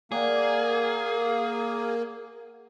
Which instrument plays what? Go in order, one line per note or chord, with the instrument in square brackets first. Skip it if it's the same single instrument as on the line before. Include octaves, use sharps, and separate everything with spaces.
[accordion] A#3 [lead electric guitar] G#4 [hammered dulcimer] D5 F#5 G5